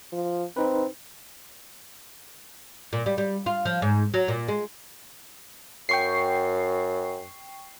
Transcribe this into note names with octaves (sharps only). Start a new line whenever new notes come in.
F3
C4 D#4 B4
A#2
G3
G3
F4
F3
G#2
F#3
A#2
G#3
F#2 G5 C#6 C7